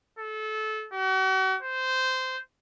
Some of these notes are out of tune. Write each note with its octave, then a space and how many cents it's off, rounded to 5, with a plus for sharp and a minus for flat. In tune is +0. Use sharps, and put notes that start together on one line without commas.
A4 -25
F#4 +40
C5 -15